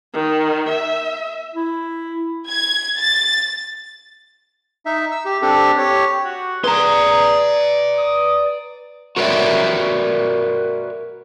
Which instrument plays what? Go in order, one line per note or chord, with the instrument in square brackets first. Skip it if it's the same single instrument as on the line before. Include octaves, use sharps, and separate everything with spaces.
[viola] D#3
E5
[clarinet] E4
[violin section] G#6
A6
[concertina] D#4 E5
E6
G4
C4 D4 G4 A4
G4 C#5
[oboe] F#4
[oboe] G#4 [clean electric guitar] B4 A#5 [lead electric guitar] D5 C6
[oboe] D#6
[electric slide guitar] F#4 A#4 B4 C#5 D5 E5